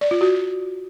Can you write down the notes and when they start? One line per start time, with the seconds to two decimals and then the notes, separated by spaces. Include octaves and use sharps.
0.01 D5
0.11 F4
0.21 F#4